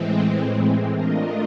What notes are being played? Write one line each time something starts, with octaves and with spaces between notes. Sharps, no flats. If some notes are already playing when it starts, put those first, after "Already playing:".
Already playing: A2 E3 G#3 C4
A3 D4 F4 A#4 D#5